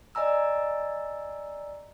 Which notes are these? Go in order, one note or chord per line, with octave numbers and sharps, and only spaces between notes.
D5 D#5 G#5 A#5 E6